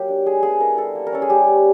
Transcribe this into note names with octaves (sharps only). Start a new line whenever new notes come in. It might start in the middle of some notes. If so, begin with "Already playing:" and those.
Already playing: F#3 A#3 G4
D4
G#3 G#4
B3 G#4
E4 A#4
G3 A4
A#3
A#4
C#4 A4
G#4
G3 G4
B3